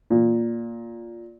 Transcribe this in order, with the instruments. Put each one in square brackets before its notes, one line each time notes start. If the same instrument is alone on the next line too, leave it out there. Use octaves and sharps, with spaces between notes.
[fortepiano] A#2